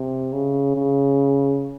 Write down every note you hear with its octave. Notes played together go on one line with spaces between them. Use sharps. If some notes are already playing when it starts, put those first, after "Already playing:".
Already playing: C3
C#3
C#3